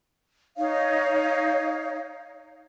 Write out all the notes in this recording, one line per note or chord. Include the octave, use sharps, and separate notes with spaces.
D#4 C#5 F5